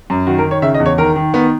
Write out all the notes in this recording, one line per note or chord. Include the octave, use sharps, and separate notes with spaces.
F#2
D#3 F#4
A#4
D#3
C#5
C#3 E5
D#5
E2
C#5
D#3 A#4
D#3
D#3 B3